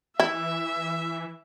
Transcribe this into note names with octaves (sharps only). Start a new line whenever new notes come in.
E3 E4 E5